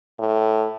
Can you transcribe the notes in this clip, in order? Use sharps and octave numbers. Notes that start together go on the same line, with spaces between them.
A2